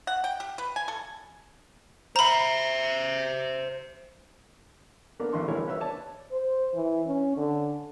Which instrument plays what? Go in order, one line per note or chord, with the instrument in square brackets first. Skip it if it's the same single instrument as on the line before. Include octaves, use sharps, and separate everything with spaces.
[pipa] F#5
G5
G4
B4
G#5
A4
[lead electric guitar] C5 E5 [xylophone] A#5 B5
[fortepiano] A#3 B3 D4 A#4 D5
A1 B3 E4 C6 C#6
A#1 E3 G3 E4 A#4 C#5
F4 A#4 B4 C#5 E5 E6
C#5 D5 A5
[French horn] C5
E3
C#4
D3